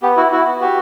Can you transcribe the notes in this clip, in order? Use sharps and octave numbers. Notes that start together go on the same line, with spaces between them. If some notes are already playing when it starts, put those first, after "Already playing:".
B3 G4
E4 F#4
E4 F#4
B3
F#4 G4